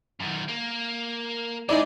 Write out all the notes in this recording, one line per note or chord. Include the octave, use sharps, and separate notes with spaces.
F#2 D#3
A#3
G#3 D#4 E4 G#4 D5